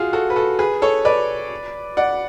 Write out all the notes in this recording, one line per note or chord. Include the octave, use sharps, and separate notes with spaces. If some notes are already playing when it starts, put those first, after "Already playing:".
Already playing: F4 F#4 G#4
F#4 A4
B4
F#4 A4
G#4 B4
A4 C#5
B4 D5
D5 F#5